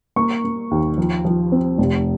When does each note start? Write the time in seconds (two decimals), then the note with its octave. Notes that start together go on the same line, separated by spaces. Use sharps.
0.16 A#3 C#6
0.44 A#3
0.71 D#2
0.98 F3
1.25 F3
1.52 C4
1.78 F1